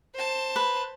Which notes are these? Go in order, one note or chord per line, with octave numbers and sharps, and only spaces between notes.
C5 A5
B4